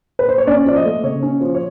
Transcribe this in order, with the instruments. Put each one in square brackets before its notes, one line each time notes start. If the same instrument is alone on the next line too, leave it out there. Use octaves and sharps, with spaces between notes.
[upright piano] B4
C5
C#5
C#4 D5
F3 D5
D#5
A3
C#3 C#5
C#4
F3
C#5